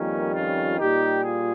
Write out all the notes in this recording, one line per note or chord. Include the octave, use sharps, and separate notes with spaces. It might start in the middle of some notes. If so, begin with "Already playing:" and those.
Already playing: F2 D#3 G3 A#3 C#4
C#4 F4
A#2 G3 D#4 G4
F4 G#4